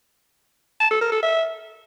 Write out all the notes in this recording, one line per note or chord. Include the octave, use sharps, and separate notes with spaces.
A5
A4
A#4
A4
E5